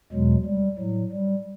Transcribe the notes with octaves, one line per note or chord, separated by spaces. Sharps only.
E2 B2 F#3 G#3
G3
A2 F#3
G3